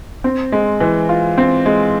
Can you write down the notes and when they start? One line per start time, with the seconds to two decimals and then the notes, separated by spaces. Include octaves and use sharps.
0.24 C4
0.52 G#3
0.80 E3
1.09 F4
1.38 C4
1.66 G#3